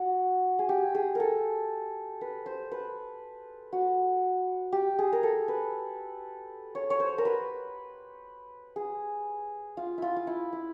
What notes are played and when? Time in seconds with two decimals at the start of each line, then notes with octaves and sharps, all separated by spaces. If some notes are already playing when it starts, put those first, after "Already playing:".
Already playing: F#4
0.59 G#4
0.69 G4
0.95 G#4
1.15 A4 A#4
2.21 B4
2.46 C5
2.71 B4
3.73 F#4
4.72 G4
4.99 G#4
5.13 A#4
5.23 A4
5.48 B4
6.75 C#5
6.90 C#5
7.00 C5
7.18 A#4
7.25 B4
8.76 G#4
9.77 F4
9.98 E4 F4
10.16 F4
10.27 E4
10.53 E4